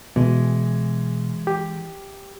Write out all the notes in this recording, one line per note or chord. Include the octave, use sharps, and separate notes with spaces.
B2 E3 G#3
G4